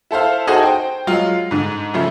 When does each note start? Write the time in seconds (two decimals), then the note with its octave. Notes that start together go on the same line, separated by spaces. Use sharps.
0.11 E4 A4 C5 F5
0.47 D#4 F#4 G#4 A4 C5
0.63 C5 G5
1.07 F#3 G#3 F4
1.51 G#2 D3
1.94 C#3 F3 A3